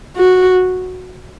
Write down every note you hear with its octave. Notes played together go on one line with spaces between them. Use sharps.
F#4